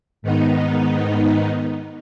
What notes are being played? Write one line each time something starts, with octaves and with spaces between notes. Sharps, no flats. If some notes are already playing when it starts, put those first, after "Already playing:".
G#2 D#3 B3 D#4